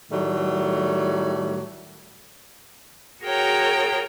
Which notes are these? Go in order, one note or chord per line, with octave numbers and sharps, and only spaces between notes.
A2 D#3 F#3 G3 A3
F#4 G#4 A#4 C#5 G5 A#5